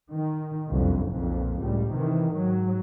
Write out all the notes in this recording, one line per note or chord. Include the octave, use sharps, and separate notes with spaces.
D#3
F#1 C2 F2 D3
B1 F2 A#2
C#2 A2 G3
C3 D#3 E3
G#2 F#3